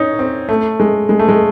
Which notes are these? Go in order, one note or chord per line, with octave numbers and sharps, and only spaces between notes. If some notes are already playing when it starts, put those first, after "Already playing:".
Already playing: C#4 D#4
C4
A3
G#3
G#3
A3
G#3